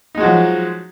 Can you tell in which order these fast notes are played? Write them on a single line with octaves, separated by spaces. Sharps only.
D#4 G#3 F#4 F3 F#3